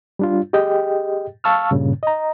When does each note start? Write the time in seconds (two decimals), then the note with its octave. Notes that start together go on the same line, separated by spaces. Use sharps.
0.19 G3 D4 F4
0.53 G4 G#4 D#5 G5
1.44 F5 A5 C#6 E6 F6
1.71 G2 A#2 C#3
2.03 D#5 A#5